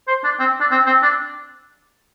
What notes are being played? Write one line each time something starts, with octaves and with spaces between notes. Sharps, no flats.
C5
D4
C4
D4
C4
C4
D4